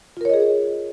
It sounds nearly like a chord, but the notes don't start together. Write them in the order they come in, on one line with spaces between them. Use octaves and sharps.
F4 A#4 C#5 D#5 G#4